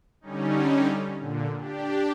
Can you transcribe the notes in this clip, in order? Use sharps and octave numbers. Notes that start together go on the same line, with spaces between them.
D3 G3 C#4 D#4
A#2 D3
D4 G4